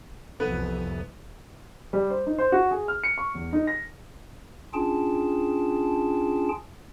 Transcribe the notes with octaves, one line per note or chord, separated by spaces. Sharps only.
C2 F2 E3 B3 B4
G3
C5
D#4
C5
F#4
G#4
F6
C#7
C#6
E2
D#4
A#6
C#4 D4 F4 G#4 G5 A5